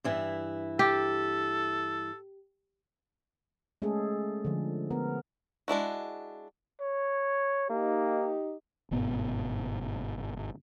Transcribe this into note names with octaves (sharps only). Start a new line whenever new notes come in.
G2 E3 E4
G4 A4
G#3 A3 C#4 G#4 A4
D3 F3
B3 A#4
G#3 D4 E4 F#4
C#5
A#3 D#4 G4
G1 G#2 B2 B3